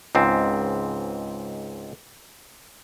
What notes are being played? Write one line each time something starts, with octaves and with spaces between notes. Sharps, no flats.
C#2 G#2 C4